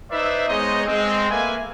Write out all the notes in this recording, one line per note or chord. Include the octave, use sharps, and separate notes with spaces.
D#4 B4 C5 D5 E5
G#3 B3 D#4 C5 C#5 D#5
G#3 C4
A3 A#3 B4 E5 G#5